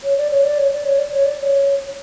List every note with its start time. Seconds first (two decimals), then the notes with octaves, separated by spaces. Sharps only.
0.04 C#5
0.17 D5
0.31 C#5
0.44 D5
0.58 C#5
0.71 D5
0.85 C#5
0.99 D5
1.12 C#5
1.25 D5
1.38 D5
1.42 C#5